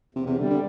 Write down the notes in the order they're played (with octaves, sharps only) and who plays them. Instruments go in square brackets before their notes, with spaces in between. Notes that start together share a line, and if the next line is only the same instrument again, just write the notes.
[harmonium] E2 [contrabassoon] C3
[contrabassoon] C3
[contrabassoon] D3 [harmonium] G3
[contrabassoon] D3